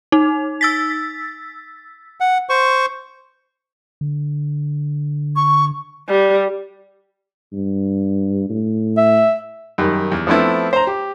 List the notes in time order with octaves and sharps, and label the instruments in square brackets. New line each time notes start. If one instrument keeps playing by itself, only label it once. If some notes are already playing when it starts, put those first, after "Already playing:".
[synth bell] D#4
E6 A6 B6
[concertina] F#5
C5 C#6
[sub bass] D3
[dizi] C#6
[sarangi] G3
[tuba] G2
A2
[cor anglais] E5
[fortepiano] F#2 D#3 G3
E2
F3 A3 B3 C4 E4
C5 A#5
G4